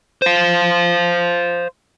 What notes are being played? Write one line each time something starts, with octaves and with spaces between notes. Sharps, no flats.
C5 F5